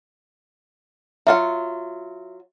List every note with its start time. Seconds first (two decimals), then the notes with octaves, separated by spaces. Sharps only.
1.27 F#3 F4 E5 F#5